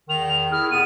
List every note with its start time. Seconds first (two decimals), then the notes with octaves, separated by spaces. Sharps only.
0.09 E2 D#3 F7
0.51 E4 G#4 F6
0.71 F2 C3 B3 D#7